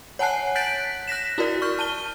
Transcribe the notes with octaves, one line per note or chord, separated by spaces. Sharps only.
C#5 F#5 G#5 A5 F#6 C7
F#6 G6 A6 B6 D7 F#7
F#6 A#6 B6 E7
E4 F#4 A#4 D5
C#6 F6 G6
A5 D#7 G7